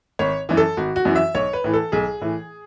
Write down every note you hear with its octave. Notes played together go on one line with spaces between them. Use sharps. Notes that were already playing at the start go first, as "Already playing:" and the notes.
G#1 C#5
F#2 E3
A4
G#1 F#4
F#4
F#2 E3
E5
B1 C#5
B4
A2 E3
A4
B1 G#4
A2 E3